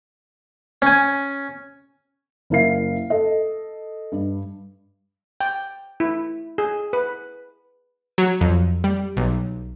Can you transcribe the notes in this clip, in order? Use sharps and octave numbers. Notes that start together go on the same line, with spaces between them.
C#4 G#5
F#1 E4 A#4 E5 F5 C7
A4 D#5
G2
G5
E4
G#4
B4
F#3
F2
G3
B1